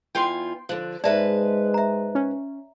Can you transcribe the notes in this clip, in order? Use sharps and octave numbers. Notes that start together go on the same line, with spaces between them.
E2 F4 G5 G#5 C6
D3 F3 F#6
G#2 G#3 B4 D5 E5 A5
E5 A#5
C#4